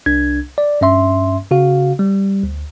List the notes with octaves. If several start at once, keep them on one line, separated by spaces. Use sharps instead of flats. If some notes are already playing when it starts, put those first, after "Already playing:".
C2 D4 G#6
D5
G2 C#4 E5 C6
C#3 F#4 F5
G3
D2